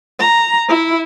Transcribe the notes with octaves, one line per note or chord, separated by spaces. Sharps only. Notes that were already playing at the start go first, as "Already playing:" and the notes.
A#5
E4